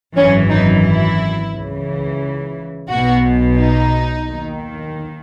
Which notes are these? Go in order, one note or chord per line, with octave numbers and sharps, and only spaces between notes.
G#1 F#2 E3 C#4
D#4
E4
C#2 C#3 E3
B1 B2 F#4
D#4
D#2 D#3